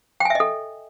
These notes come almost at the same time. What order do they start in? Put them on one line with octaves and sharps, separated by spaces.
G5 G#5 E5 D#5 A4